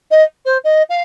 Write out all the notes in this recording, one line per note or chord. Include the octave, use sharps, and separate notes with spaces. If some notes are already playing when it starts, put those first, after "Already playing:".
D#5
C5
D#5
F5